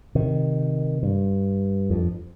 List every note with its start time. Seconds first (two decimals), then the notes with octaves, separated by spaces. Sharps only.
0.15 C3 D#3
1.03 G2
1.90 F2